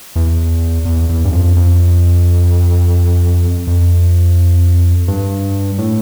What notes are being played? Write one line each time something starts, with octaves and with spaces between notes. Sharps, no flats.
E2
E2
E2
G2
F2
F2
F2
G2
A2